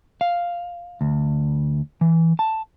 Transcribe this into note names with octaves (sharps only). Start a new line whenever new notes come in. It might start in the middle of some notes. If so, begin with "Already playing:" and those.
F5
D2
E3
A5